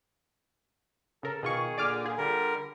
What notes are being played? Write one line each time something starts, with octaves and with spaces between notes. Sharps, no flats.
C#3 A4 A#4
B2 D#3 F4 G#4 C#6
A#2 D3 D5 D6 F6
F4 G#4
D3 G3 A#4